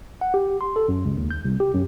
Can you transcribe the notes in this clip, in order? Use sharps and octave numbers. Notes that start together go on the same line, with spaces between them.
F#5
G4
C6
A4
F#2
C#2
D#2
G6
C2
G4
F#2